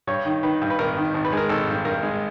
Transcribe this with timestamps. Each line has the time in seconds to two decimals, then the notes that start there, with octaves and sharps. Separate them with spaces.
0.07 G2 C#5
0.25 D#3
0.43 D#3 B4
0.61 G2
0.70 B4
0.79 G#1 A#4
0.97 D#3
1.14 G#1
1.25 B4
1.33 G#3 A#4
1.49 G#1 A4
1.68 G2
1.85 G2 A#4
2.03 G#3